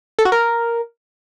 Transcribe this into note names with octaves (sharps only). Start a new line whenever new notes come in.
A4
F#4
A#4